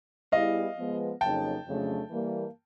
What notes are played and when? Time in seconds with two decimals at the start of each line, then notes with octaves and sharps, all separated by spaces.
0.32 G3 B3 E4 G#4 D#5 F5
0.77 F3 G#3 B3
1.21 F2 C#3 F#3 A#3 D#4 G5 A5
1.66 F2 C#3 F#3 A3 D4
2.10 E3 G3 A#3